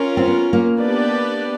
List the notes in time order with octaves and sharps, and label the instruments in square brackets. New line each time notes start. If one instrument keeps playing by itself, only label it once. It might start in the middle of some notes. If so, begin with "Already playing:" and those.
Already playing: [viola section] C#4 F4 A#4
[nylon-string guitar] C4
B3
A#3
[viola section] B3 D4 G4 B4 D5